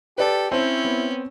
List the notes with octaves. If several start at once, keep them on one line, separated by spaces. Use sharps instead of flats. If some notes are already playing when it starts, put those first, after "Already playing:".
G4 A4 B4 D5
C4 C#4 E4 C5 C#5
B3